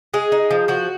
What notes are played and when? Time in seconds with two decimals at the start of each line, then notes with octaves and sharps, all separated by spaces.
0.14 G#3 G#4
0.32 D#4
0.51 F3
0.68 F3 F#4